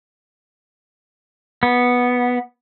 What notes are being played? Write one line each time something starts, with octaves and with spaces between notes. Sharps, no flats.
B3